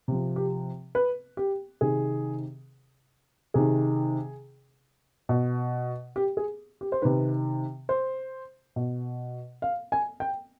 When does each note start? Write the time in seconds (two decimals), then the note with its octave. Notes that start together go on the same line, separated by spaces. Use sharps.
0.08 C3 F3
0.36 G4
0.95 B4
1.37 G4
1.81 C3 D#3 G#4
3.54 C3 D#3 G#4
5.29 B2
6.16 G4
6.37 G#4
6.81 G4
6.92 C5
7.02 C3 D#3 B4
7.89 C5
8.76 B2
9.62 F5
9.92 G#5
10.20 G5